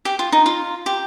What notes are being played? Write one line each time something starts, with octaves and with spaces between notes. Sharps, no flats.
G4
F4
D#4
F4
G4